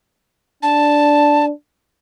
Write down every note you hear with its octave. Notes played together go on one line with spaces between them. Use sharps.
D4 A5